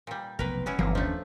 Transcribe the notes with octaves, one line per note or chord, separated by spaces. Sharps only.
A#2 G3
F1 B1 A#4 B4
B3 C#4 E4
G1 E3 F#3 A#3 C4
D#2 F3 A3 C#4 D4